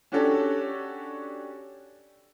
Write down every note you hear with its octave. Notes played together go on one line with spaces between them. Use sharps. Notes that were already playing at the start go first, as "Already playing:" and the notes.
C#4 D4 F#4 G4 A4 C#5